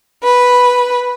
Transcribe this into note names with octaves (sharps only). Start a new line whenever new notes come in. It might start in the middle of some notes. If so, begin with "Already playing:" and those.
B4